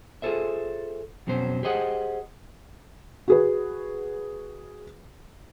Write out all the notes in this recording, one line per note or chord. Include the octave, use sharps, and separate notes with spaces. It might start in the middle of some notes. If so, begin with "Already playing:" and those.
F4 G#4 A4 C5 E5
F2 B2 F#3 C#4 C5
G4 G#4 C5 D#5 F#5
F#4 G#4 B4